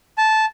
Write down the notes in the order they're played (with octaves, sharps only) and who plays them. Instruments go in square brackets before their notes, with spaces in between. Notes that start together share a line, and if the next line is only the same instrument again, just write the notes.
[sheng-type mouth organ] A5